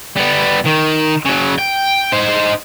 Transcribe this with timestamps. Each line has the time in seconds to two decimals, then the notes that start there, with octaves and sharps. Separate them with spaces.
0.17 G3 B3
0.65 D#3
1.26 C#3 F#3
1.59 G5
2.13 D#4 C5